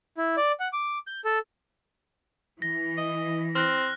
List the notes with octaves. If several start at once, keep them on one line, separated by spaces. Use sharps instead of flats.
E4
D5
F#5
D6
G6
A4
E3 A#6
D#5
C4 F6 F#6 A#6